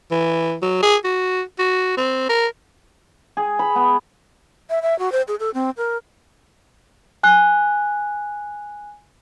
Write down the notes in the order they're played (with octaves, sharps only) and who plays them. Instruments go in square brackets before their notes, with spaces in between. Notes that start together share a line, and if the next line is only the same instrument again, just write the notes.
[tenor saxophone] E3
F#3
G#4
F#4
F#4
C4
A#4
[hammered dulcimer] G#4
B5
B3
[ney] E5
E5
F#4
C5
G#4
A4
C4
A#4
[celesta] G#5 F#6